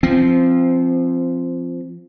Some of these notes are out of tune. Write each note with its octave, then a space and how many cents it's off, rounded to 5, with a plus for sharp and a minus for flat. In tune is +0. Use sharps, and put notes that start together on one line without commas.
F3 -15 C4 +0